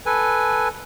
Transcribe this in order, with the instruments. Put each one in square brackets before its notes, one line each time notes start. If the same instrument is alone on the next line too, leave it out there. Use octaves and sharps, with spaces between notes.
[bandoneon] A4 B4 G#5